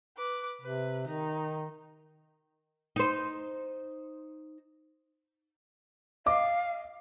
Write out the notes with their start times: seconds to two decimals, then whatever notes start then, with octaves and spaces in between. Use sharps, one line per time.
0.17 B4 D6
0.61 C3 B4
1.07 D#3 D#4
2.96 D#4 C5
6.26 D#5 F5 D6